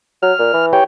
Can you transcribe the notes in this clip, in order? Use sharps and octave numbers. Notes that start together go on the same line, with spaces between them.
F#3 F6
A#2
E3
G4 C#5 G5